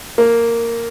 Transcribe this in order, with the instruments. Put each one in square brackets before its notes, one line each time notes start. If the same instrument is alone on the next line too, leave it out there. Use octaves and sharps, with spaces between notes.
[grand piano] A#3